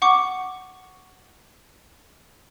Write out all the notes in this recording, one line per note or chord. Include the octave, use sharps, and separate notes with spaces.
F#5 C#6 D6